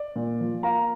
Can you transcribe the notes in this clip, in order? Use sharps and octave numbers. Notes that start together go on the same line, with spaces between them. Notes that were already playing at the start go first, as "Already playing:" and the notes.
Already playing: D5
A#2
F3
A#3 F5 A#5